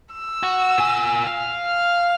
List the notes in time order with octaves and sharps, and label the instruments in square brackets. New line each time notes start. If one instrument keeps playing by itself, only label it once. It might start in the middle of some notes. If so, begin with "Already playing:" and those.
[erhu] E6
[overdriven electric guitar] F#4
A#2 G#5
F5
[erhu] F6